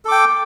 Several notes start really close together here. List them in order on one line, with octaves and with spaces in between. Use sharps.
A4 D6 G5